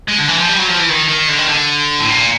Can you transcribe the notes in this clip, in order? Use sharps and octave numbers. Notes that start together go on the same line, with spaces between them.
G#3
D3
E3
F3
G3
F#3
F3
E3
D#3
D#3
D3
D#3
D3
A2
A#2